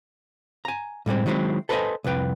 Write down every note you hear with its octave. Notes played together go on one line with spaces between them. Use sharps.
G#5 A#5
A2 G3 G#3 C4
D#3 F#3 G#3 C4 E4
A4 B4 C5 D5 D#5 G#5
C2 F2 B4 G5